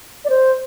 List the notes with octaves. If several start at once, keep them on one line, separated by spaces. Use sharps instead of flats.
D5
C5